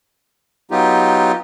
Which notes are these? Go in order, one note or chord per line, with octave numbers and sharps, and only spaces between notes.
F#3 B3 D#4 F4 G4